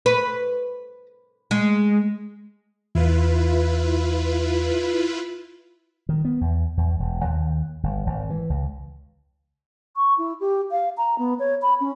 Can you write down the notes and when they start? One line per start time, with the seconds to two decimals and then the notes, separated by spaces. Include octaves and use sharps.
0.06 B4
1.51 G#3
2.95 E2 E4 F4 B4
6.09 D#3
6.25 B3
6.41 E2
6.77 E2
7.00 E1
7.25 D#2
7.83 G1
8.06 G#1
8.30 E3
8.50 C#2
9.96 C#6
10.18 E4
10.41 G4
10.71 F5
10.97 A#5
11.18 B3
11.39 C#5
11.62 B5
11.80 C#4